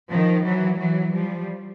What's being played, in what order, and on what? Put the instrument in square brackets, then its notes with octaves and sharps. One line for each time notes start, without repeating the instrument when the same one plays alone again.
[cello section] D#3 F3
E3 F#3
E3 F#3
F3 G3